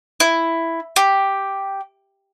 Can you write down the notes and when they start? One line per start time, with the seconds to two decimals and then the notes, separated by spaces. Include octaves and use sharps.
0.20 E4
0.96 G4